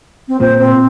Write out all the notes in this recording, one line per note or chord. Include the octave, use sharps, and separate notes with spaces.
C4
A#2 C5
C4